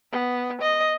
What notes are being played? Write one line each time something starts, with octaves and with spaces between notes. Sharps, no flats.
B3
D#5